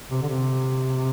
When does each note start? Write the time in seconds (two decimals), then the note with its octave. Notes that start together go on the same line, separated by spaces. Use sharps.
0.10 C3
0.22 D3
0.29 C3